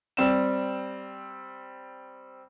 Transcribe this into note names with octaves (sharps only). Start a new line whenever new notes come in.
G3 C4 E7